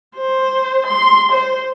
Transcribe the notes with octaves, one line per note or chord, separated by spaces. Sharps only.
C5
C6
C5